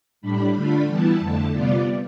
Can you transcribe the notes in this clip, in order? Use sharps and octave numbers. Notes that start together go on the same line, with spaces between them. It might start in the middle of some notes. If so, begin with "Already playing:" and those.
A2 G3 D4 B5
D3 A3 D4 F4 B5
E3 G3 B3 E4 A5
F2 D3 A3
C3 G3 B3 F4 D5